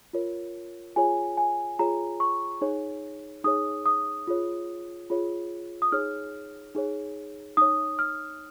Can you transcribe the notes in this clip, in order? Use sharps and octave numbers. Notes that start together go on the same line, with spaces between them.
F4 A#4 C#5
F4 G#4 C#5 G#5
G#5
F4 G#4 C#5 A#5
C#6
D#4 G#4 C#5
D#4 G#4 C#5 D#6
D#6
F4 G#4 C#5
F4 G#4 C#5
D#6
D#4 G#4 C#5 F6
D#4 G#4 C#5
D#4 C#5 D#6
F6